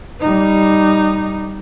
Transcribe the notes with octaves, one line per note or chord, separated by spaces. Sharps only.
G3 D#4